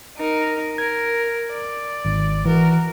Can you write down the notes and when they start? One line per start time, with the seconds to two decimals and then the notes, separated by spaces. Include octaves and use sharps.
0.17 D#4 A#4
0.78 A#4 G#6
1.51 D5
2.05 G#1
2.45 E3 F#4 A#4